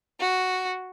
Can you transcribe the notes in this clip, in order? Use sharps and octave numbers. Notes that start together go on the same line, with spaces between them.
F#4